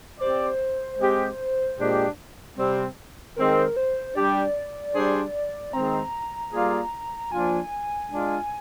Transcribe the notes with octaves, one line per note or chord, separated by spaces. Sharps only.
C4 G4 C5 D5
G#3 C4 G4
A#2 G#3 D4 G4
C3 G3 C4
D#3 G#3 C4 A#4
C5
G3 D4 G4 D5
G3 D4 G#4 C5
D#3 G#3 C4 A#5
G3 A#3 F4 G#4 D5
F3 A#3 D4 F4 G#5
G#3 D4 F4